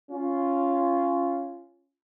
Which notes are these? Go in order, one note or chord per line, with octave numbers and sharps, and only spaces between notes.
C#4 F4